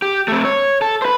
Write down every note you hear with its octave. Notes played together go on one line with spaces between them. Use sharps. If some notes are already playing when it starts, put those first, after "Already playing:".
G4
A3 C4
C#5
A4
B4 C5